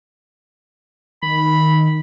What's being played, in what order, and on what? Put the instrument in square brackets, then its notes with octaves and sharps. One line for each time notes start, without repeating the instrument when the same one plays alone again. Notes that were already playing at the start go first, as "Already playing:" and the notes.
[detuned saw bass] D#3 [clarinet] B5